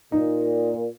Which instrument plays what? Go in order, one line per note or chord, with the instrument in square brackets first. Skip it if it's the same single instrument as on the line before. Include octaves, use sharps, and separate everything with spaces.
[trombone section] A#2 [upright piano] D#4